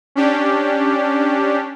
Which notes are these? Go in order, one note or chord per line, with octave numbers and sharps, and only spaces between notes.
C#4 D4 G4